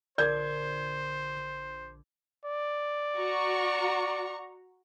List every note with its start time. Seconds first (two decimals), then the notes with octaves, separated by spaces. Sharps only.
0.18 A#1 D3 A#4 C5 D5 D6 G6 G#6
2.45 D5
3.19 F#4 A#5 C#6